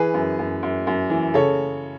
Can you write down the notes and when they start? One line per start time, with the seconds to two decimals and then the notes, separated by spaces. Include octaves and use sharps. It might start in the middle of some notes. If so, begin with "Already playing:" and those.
Already playing: E3 G#4 B4
0.14 F#2
0.39 F#2
0.63 F#2
0.87 F#2
1.10 E3
1.34 C#3 A4 C#5